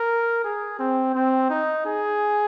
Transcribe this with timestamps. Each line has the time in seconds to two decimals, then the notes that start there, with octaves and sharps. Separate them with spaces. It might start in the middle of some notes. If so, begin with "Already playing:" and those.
Already playing: A#4
0.44 G#4
0.79 C4
1.15 C4
1.50 D#4
1.85 G#4